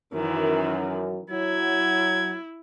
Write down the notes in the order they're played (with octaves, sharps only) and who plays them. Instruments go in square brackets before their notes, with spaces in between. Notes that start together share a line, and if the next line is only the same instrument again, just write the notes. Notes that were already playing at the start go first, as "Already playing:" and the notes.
[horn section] F#2 [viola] D#3 E3
[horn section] F#3 [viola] E4 [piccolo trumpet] G#6